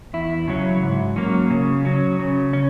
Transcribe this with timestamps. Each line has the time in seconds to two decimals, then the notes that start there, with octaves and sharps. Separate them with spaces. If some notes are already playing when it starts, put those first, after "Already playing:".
0.13 E2 E4
0.48 C#3 F#3 C#4
0.82 G#2
1.16 F#3 A#3 C#4
1.50 C#3
1.85 F#3 C#4
2.19 C#3
2.53 C#4